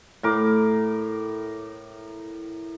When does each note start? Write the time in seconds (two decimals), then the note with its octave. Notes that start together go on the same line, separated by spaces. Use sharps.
0.23 A2 A#4 D6